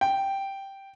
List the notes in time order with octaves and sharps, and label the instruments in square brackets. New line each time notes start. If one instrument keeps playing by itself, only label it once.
[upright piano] G5